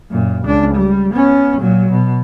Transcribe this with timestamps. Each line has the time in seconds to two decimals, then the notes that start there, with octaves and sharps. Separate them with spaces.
0.11 F#2 A#2
0.45 C#2 D4
0.74 G3
1.14 B3 C#4
1.60 A#2 F#3
1.91 B2